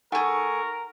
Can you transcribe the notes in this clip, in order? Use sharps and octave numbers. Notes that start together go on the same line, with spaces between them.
A3 D#4 G#4 A#4 F#5 G#5 C#6